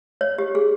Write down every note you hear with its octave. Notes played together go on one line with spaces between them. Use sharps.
C#5
G4
G#4